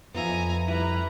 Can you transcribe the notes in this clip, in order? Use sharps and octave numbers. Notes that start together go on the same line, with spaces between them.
F2 B3 F4 E5 G#5 A#5
G3 E4 B4 A#5